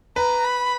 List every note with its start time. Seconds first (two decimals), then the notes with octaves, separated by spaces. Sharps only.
0.16 B4 A#5
0.44 B5